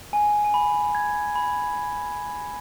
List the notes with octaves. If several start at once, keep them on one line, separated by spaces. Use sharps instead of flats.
G#5
G#5
B5
G#6
B5